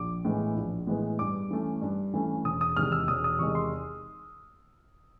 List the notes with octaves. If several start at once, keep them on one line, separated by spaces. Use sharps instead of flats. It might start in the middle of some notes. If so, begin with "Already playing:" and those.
Already playing: A#1 D6
A2 E3 G#3 B3
A#1
A2 E3 G#3 B3
G2 D6
E3 A3 C#4
G2
E3 A3 C#4
E1 D#6
D#6
E2 C3 D#3 G#3 F6
E6
E1 D#6
D#6
E2 C3 D#3 G#3 C#6
C6